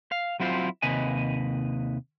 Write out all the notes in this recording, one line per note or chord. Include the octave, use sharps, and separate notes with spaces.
F5
F#3 C4 E4 F4 C5
D#2 C3 B4 D#5 G#5